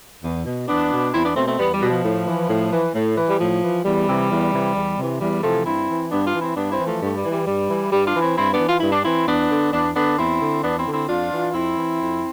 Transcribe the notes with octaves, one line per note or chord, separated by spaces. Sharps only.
E2
B2
E2 B3 D4
B2
E2 C4 E4
B3 D4
B2 A3 C4
A3 C4
E2 G3 B3
G3
B2
F3
A2
E3
A2
E3
A2
E3
G3
A2 F3
E3
E2 G3
C3 E3
E2
C3 E3
E2
C3 E3
E2 G3
C3 E3 F3 A3
G2 C4 E4
E3
G2 B3 D4
D4 F4
E3
C4 E4
G2 B3 D4
C4 E4
E3
F3 A3
G2 A3
G3
E3
G3
G2 G3
E3
G2 G3
D4 F4
E3
C4 E4
G2 C4 E4
B3 D4
E3
F4
G2 E4
D4
E3 C4 E4
E2 B3 D4
D3
E2 B3 D4
D3 B3 D4
E2 C4 E4
D3
E2 B3 D4
C4 E4
D3
C4 E4
F2 D4 F4
E3
F2 C4 E4
E3
F2